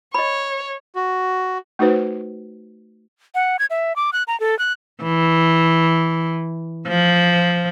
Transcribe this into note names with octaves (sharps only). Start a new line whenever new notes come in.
C#5 D#5 B5
F#4
A3 D#4 F#4 B4 C5
F#5
G#6
E5
D6
F#6
A#5
A4
F#6
E3
F3